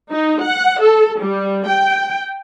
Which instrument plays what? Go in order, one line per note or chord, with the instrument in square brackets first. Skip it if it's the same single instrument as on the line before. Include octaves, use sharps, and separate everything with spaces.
[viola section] D#4
F#5
A4
G3
G5